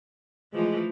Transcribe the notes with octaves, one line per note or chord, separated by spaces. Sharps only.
E3 F3 G#3 A3